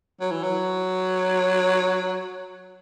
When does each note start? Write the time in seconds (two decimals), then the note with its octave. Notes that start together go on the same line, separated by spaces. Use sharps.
0.20 F#3
0.31 E3
0.43 F#3